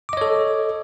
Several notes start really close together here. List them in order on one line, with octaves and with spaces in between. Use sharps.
D6 D#5 C#5 A4